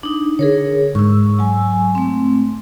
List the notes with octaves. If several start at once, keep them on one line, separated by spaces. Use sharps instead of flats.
D4 D#4
D3 G#4 A#4 C#5
G#2 C#6 E6
F#3 G#5
A3 C4